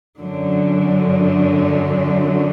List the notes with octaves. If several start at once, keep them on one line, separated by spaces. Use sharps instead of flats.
F#2 D3 F#3